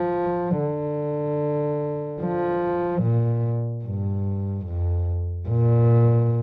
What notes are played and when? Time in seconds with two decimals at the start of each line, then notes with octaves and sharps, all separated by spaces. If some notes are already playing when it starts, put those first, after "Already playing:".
Already playing: F3
0.59 D3
2.22 F3
3.03 A#2
3.85 G2
4.66 F2
5.48 A#2